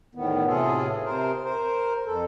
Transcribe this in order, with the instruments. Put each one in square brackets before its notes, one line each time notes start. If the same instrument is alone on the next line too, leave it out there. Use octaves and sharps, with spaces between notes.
[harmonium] E2 A2 D#3 B3
A2 C3 E3 F4 G#4 A4
C3 A#4 C5
A#4 C5
F2 A4